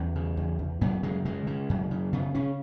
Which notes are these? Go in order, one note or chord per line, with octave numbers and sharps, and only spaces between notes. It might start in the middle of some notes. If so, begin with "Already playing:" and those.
Already playing: E2 C#4
C#3
E2
E2
F#2 B3
C#3 G#3
C#3 G#3
C#3
F#2
C#3
C#3 B3
C#3 C#4